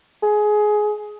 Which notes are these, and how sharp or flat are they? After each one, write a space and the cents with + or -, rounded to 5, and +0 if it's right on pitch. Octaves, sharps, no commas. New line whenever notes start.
G#4 +15